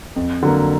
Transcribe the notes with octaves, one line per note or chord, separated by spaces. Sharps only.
F2
D3 F#3 A#3